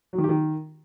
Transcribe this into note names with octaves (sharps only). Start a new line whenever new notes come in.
F#3
D#3
G4
D#3